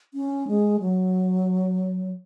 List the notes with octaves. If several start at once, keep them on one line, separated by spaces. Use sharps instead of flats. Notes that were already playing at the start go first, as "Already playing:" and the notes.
C#4
G#3
F#3